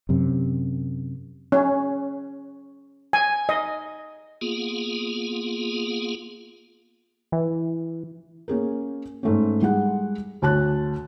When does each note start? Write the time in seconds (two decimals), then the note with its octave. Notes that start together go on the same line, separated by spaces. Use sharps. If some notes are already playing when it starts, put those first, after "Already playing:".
0.09 F#2 C3
1.52 C#4
3.13 G#5
3.49 D#5
4.41 A#3 B3 F4 G#4
7.32 E3
8.48 A#3 C#4 G#4 A#4
9.23 G#2 A3 C#4
9.62 G3 G#3 G#4 F#5
10.42 D2 C#5 A5 F#6